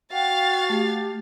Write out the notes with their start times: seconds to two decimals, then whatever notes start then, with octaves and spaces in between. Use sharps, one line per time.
0.12 F#4 F5 G5 A6
0.70 A3 G4